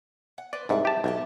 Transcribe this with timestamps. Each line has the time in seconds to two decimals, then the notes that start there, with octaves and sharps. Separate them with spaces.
0.38 F#5
0.53 B4 C5 D5
0.69 C2 G#2 B4 E5 F#5
0.85 G4 A5
1.04 B1 A3 G#5 A5